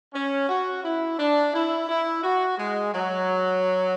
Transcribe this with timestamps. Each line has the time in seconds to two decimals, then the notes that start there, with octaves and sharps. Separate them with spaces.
0.14 C#4
0.49 F#4
0.84 E4
1.19 D4
1.54 E4
1.89 E4
2.23 F#4
2.58 G#3
2.93 F#3